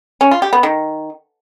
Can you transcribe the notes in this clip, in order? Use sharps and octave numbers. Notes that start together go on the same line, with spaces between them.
C#4
F4
G4
B3
D#3